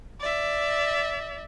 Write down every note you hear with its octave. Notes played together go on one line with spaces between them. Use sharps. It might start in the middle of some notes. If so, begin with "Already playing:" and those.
D5 E5